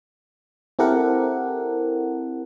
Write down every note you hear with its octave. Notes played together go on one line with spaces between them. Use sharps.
C4 E4 G4 A4 A#4 F#5